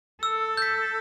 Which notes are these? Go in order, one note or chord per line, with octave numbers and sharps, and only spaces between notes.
A4 E6
G6 B6